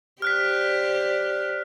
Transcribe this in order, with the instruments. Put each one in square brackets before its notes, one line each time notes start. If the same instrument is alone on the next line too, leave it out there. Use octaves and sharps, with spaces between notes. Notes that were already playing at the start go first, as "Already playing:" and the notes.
[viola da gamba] G4 C5 D5 [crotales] F6 F#6 B6